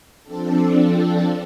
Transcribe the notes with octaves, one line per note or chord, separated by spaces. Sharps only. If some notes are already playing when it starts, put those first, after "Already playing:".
F3 C4 D4 A4